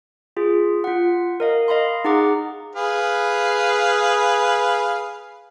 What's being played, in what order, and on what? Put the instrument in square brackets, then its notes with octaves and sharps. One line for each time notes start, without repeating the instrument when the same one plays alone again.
[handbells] F4 G#4
F4 F#5
A#4 D#5 F5
D#5 F5 B5 C6
D#4 G#4 F#5 A#5 D6
[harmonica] G#4 B4 F5